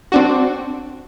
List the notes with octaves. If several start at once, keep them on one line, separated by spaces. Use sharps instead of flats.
C4 D4 F#4